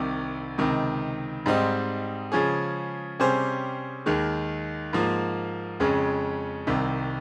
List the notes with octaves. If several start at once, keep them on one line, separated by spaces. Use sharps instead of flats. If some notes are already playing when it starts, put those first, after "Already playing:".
Already playing: C2 C3 D#3
C#2 C3 D#3
G#2 G3 C4 D#4
C#3 F3 G#3 C#4 G#4
C3 G3 C#4 G#4 C5
D#2 D#3 G#3
G#2 F3 A#3
F2 C#3 G#3 C#4
C2 C3 D#3